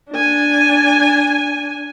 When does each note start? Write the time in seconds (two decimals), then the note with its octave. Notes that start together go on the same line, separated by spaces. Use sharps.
0.11 D4 G#5